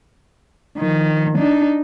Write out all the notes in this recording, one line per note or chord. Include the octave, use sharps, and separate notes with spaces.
D#3 F3
D4 D#4